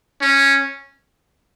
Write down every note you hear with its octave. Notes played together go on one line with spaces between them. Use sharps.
C#4